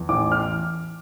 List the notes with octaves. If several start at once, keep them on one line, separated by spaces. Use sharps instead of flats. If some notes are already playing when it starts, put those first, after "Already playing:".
Already playing: E2
A1 D6
F6